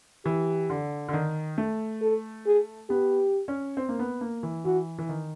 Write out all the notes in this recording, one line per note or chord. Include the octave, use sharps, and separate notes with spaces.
E3 G4
D3
D3
D#3
A3
A4
G#4
B3 G4
C#4
C4
A#3
B3
A#3
E3
E3 F#4
E3
D#3